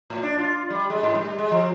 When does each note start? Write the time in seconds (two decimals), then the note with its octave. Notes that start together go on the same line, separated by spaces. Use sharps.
0.10 A2
0.23 D4
0.39 F4
0.70 G3
0.90 G#3
1.03 G#2
1.15 G3
1.38 G#3
1.51 F3